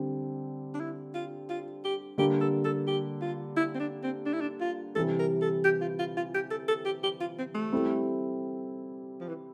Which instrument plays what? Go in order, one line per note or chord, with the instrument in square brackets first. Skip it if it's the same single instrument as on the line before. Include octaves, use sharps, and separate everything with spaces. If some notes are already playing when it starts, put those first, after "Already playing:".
Already playing: [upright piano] D3 G3 C4
[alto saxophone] D4
E4
F4
F4
G4
[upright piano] D3 G3 A#3 [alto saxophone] G4
[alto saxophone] A4
A4
G4
F4
E4
C4
D4
C4
D4
E4
D4
F4
[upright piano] C3 E3 G3 [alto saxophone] A4
[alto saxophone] A#4
A4
G4
F4
F4
F4
G4
A4
A4
G4
G4
F4
C4
A3
[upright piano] G3 C4 E4 A4
[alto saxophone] F3
E3